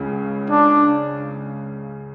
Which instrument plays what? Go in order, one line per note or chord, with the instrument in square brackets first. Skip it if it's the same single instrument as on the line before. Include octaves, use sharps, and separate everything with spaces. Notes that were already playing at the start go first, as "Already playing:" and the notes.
Already playing: [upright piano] C#2 C#3
[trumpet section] D4